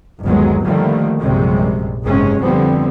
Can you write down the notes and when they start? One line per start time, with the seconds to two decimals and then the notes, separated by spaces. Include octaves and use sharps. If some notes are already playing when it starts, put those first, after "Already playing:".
0.23 G1 D#2 F#3 G#3 B3
0.64 D3 D#3 F3 G3 A3 A#3
1.20 A#1 F#2 C3 G3 G#3
2.04 F#1 G#2 C3 G#3 C#4
2.41 F1 D3 F3 G3 B3 C4